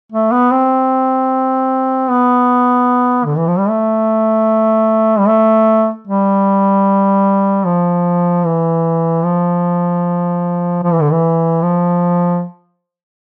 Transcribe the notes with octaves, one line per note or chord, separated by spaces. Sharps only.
A3
B3
C4
B3
D3
E3
F3
G3
A3
G3
A3
G3
F3
E3
F3
F3
E3
D3
E3
F3